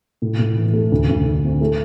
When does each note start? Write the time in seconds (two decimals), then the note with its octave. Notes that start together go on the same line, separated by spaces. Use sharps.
0.22 A2
0.39 A2
0.57 E3
0.74 A3
0.92 D2
1.09 D2
1.26 D3
1.43 C4
1.61 A3